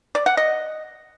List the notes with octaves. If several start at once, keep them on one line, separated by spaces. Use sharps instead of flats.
D5
F#5
D#5